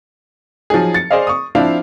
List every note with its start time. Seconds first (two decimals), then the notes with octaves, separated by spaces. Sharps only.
0.70 F3 F#3 D#4 G#4
0.94 A6 C#7
1.11 G#4 C5 D5 D#5 F5
1.27 C#6 D#6
1.55 F3 C4 D4 E4 F5